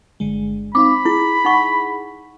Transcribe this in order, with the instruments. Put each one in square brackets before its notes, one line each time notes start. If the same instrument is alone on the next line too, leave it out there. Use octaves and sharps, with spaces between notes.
[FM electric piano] G1 D3 G#3
[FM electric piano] C4 D#4 F5 [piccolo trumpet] B5 [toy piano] D6
[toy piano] E4 [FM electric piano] G#4
[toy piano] D#4 F#5 C#6